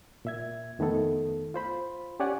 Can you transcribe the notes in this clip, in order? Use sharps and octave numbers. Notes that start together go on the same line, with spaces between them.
A#2 E5 G#6
F2 D#3 A3 B3 A4
F4 C5 B5
C#4 G4 C#5 D5 F#5 G#5